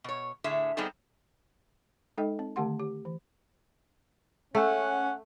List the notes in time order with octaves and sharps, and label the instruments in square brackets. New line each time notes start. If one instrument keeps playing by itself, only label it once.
[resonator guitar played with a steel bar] B2 C#5
A2 D3 G#4 E5
G3 B3 C4 D#4 G#4 A4
[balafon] G#3 D#4 A4 D#5 G5
C4
D3 D#3 A3 G4 F#5 C6
G4
E3
[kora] A3 [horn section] C#4 F#5